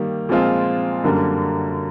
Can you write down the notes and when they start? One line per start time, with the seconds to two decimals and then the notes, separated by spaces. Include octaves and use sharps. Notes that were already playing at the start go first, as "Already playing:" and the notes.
Already playing: D#3 G3 A#3
0.29 A#2 F3 G#3 C4 F4
1.03 F#2 D3 G3 A#3